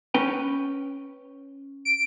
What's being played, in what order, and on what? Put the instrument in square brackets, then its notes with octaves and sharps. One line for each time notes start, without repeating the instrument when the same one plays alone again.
[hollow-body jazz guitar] C#4 B4 G5
[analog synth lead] D7